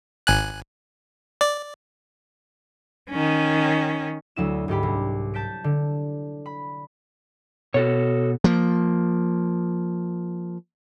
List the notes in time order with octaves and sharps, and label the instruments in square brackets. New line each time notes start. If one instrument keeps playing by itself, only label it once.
[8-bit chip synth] G#1 G#5 F#6
D5
[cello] D#3 C#4
[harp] D2 F#3 E4 E7
D2 G#2 G4 B5
C2
A5 G6 B6 D7
D3
B5
[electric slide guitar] B2 [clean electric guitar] F#4 A4 C#5
[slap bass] F3 A#3